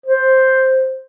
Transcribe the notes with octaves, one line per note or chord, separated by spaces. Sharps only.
C5